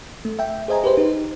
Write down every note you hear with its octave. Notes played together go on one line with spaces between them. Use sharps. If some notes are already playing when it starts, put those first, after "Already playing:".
A3
E5 G5
G#4 C5 D#5 G#5 A#5
G4 B4 C5
D#4